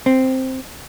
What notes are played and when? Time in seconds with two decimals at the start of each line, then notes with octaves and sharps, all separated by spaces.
0.06 C4